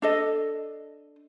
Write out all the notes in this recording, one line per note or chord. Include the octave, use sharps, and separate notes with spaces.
D4 A4 D#5